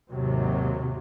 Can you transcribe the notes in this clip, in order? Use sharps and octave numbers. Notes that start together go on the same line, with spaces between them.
G#1 D#2 C3 F#3